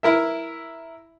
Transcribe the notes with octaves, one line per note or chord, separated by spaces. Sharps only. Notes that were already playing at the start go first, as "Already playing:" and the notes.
E4 A#4 E5